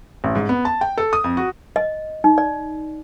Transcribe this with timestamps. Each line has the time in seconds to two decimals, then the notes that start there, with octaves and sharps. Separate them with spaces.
0.24 A1
0.35 G#2
0.49 B3
0.65 A5
0.81 G5
0.98 A4
1.13 D#6
1.24 F2
1.37 F#4
1.76 D#5
2.24 D#4
2.38 D5